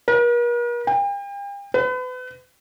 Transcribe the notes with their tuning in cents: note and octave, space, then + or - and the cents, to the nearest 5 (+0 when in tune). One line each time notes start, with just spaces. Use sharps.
A#4 +45
G5 +40
B4 +35